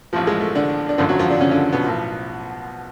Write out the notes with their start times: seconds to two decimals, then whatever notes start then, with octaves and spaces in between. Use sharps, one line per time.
0.13 A1 A2 F3
0.27 G#3
0.41 A3
0.55 D3 D4
0.89 D4
0.98 G#1 F#2 D3 F3 F4
1.09 F#3 F#4
1.19 F3 F4
1.30 D3 D4
1.41 C#3 C#4
1.51 D3 D4
1.72 B2 B3
1.84 B1 A2 F3